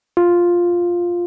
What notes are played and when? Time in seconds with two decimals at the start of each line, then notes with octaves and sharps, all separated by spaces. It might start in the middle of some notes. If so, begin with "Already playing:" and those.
0.17 F4